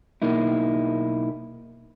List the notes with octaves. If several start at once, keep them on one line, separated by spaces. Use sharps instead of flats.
B1 A#3 D#4 E4